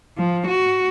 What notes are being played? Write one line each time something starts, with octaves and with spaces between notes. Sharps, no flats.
F3
F#4